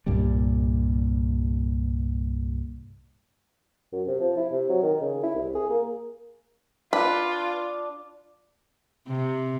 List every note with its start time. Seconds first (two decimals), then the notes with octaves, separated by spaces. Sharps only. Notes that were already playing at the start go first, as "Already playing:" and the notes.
0.06 C2 G2 A#2 G3
3.92 F#2
4.07 C3
4.20 F3
4.37 E4
4.52 C3
4.70 F#3
4.83 D#3
5.01 C#3
5.23 E4
5.35 C2
5.55 G#4
5.70 A#3
6.93 D4 F4 B4
9.08 C3